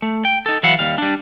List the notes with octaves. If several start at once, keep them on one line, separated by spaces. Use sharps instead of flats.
A3
G5
D#4 A4
E3 F#3 E4 F5 F#5
D#2 G3 F5
G3 D4